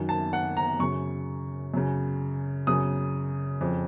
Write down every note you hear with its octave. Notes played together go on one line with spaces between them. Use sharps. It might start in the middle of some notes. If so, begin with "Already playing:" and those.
Already playing: F#2 D#3
A5
F#5
A#5
F#2 C#3 C#6
F#2 C#3
F#2 C#3 D#6
F2 C#3